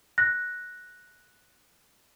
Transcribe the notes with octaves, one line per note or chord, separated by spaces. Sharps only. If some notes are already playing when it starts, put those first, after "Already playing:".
F#6 A#6